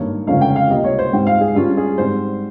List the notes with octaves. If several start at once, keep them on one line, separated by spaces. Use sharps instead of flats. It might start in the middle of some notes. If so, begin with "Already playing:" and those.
Already playing: G#1 G2 D#3 A#3 C#5
G1 F2 C#3 G#3 C#4 F5
G5
F5
C#2 C3 G3 A#3 D#5
C#5
C5
G#2 G3 C4 G5
F5
G#4
G2 G3 C#4 F4
G#4
G#2 G3 C4 C5